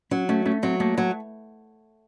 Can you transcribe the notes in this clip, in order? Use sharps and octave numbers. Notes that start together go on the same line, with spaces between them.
F#3 C#4
A3 C#4
A3 C#4
F#3 C4
A3 A#3
F#3